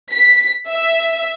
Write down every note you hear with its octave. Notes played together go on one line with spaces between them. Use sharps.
B6
E5